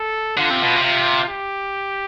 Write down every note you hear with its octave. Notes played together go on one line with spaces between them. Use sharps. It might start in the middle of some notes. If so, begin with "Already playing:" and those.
Already playing: A4
D3 F4
C3
B2
C3
F4
G4